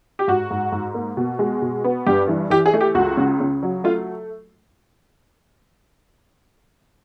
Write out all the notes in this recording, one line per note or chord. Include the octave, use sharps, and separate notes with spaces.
G4
G#2 F#4
G#2
G#2
A#3
B2
G#3
B2
B3
G2 G4
E3
E3 G4
G#4
A3
G4
C#2 F#4
C#3
C#3
F#3
A3 F4